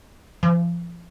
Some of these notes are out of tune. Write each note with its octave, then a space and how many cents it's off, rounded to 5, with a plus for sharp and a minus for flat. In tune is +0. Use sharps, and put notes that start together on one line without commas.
F3 -30